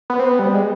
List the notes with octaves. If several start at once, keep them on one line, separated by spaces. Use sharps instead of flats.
B3
C4
B3
G3
G#3